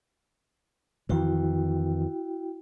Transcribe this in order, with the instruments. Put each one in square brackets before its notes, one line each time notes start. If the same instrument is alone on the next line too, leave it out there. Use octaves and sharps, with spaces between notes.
[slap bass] F2 D#3 E3 [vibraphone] E4 F#4 G5